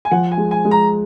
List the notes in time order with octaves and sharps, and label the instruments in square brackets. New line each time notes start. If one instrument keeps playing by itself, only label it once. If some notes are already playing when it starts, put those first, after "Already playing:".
[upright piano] G#5
[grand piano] F3 [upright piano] F#5
[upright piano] G#5
[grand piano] G#3
[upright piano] G#5
[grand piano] G#3
[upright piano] A#5